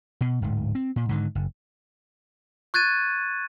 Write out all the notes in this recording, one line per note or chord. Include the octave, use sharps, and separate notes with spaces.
B2
D1 G#2
C4
A#2
G#2 D3 D#3
F#1
C#6 F#6 G#6 A6 D#7